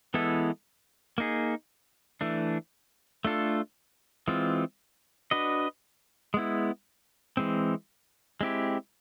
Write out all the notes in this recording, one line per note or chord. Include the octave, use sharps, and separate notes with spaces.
E3 G#3 B3 E4 A4
A#3 D#4 G#4
E3 A3 D4
A3 D4 F4 A4
E3 G#3 C4 F4
D4 F#4 B4 D#5
G#3 B3 E4
E3 G#3 C4
G#3 C4 E4 G4